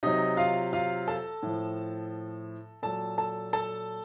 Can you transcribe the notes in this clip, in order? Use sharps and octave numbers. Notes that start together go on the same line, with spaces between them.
C3 F#3 D#4 D#5
F4 F5
F4 F5
A4 A5
A2 F3
A#2 F#3 A4 A5
A4 A5
A4 A5